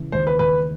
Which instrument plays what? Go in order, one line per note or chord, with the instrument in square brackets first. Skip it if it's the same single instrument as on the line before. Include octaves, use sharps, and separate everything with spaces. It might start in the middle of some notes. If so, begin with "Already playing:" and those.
Already playing: [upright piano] C#3 E3
[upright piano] D#2 [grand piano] C5
[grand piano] B4
[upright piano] D#2 [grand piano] B4